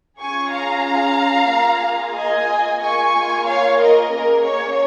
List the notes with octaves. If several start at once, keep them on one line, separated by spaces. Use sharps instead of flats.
C#4 F4 G#4 G#5 C#6
F5 A#5
A#3 F4 G#4
D#5 G#5
A#3 F4 G#4 G#5 C#6
C#5 F5
A#4 D#5
A#3 C#4 G#4 A#4
C#5